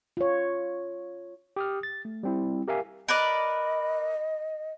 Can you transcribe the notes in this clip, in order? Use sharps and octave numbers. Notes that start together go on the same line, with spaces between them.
F4 C#5
G4 D#6 F6
A6
A3
G3 C4 E4
G4 A#4 E5 F5 G#5
A#4 B4 D5 D#5